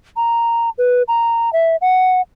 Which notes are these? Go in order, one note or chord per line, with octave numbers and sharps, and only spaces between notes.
A#5
B4
A#5
E5
F#5